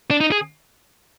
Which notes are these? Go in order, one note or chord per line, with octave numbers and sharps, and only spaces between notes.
D4
D#4
G#4